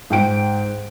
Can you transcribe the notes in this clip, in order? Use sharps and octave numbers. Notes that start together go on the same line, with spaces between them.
G#2 G5 D7